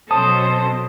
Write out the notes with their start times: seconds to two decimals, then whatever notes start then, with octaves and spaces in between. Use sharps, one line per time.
0.11 B2 F#3 C#4 A4 C5 A5 D#6